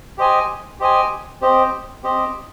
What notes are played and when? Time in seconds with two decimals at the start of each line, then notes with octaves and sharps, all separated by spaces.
0.17 G4 C5 D#5 G#5
0.79 G4 C5 D#5 G#5
1.41 C4 G4 C5 D#5
2.03 C4 G4 C5 D#5